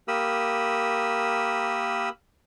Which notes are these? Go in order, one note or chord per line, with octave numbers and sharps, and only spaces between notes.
A#3 G4 A#4 B5 D#6 E6